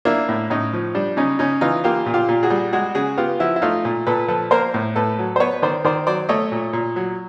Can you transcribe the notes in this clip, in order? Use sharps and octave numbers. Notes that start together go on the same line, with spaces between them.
A#3 D4 E4
A2
A2 C#4 D#4
F3
G3 D4
C#3 C#4 D#4
C#3 C#4 D#4
E3 D#4 F4
A#3 F4 G4
A#2
F4 G4
A#2
F#4 G#4
G3
G#3 F#4 G#4
C#3 F#4 G#4
B3 F4 G4
F3 E4 F#4
E4
A3 D#4 F4
A#2
A#2 A4 B4
F3 A4 B4
A#3 A#4 C5
A2
A2 A4 B4
F#3
C5
B3 B4 C#5
D#3 C5 D5
D#3 C5 D5
F#3 C5 D5
A3 C#5 D#5
A#2
A#2
F#3